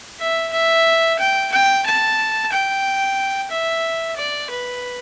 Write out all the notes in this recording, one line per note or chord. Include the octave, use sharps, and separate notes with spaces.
E5
E5
G5
G5
A5
G5
E5
D5
B4